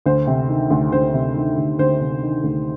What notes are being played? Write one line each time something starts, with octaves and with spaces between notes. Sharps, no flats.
D2 C5
C3
D#3
D2
D2 C5
C3
D#3
D2
D2 C5
C3
D#3
D2